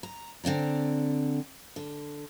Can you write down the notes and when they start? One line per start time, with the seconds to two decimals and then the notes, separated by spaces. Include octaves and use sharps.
0.03 A#5
0.44 D3 C4 D5 A#5
1.76 D3